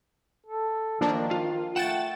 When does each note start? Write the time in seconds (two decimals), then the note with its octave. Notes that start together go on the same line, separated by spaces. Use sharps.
0.46 A4
1.01 D#3 F3 A#3 D4
1.31 F4
1.76 A3 F#5 G5 A6 E7